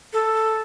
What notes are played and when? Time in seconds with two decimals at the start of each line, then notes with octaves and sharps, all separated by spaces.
0.13 A4